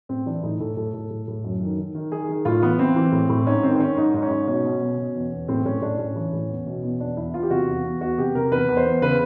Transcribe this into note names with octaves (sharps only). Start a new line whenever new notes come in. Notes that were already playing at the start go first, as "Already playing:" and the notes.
A2 C4
E3 D4
A2 D#4
A2 A4
A2 A4
A2
A2
A2
F#2
D#3
D#3
D#3
D#3 G#4
D#3
A2 F4
E3 B3
E3 C4
E3
A2
A2
G#2 C#4
D#3 C4
C4
D#3 C#4
G#2 D#4
G#2
C#4
G#2
B2 C#4
B2
B2
B2
E2
E2
A2 C4
A2 C#4
A2 D4
A2 C#4
E3
A2
E2
B2
E2
E2 D4
E2 E4
E2 F4
G4
C3 F#4
E2
E2
E2 F#4
C3 G4
C3 A#4
E2 B4
E2
C5
E2
C#3 B4